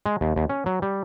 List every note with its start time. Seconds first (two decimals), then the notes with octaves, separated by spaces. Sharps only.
0.06 G#3
0.21 D#2
0.36 D#2
0.49 C#4
0.66 F#3
0.82 G3